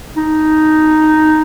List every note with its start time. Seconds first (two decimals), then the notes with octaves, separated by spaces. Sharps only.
0.17 D#4